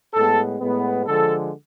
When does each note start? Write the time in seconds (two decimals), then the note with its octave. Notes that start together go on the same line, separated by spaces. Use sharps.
0.13 A2 G#3 B3 A4
0.60 A2 G#3 B3
1.06 D3 F3 G#3 A4